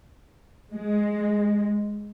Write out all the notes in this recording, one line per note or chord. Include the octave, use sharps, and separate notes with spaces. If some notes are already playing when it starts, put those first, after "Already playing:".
G#3